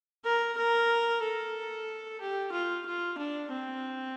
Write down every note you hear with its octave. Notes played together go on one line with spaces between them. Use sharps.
A#4
A#4
A4
G4
F4
F4
D4
C4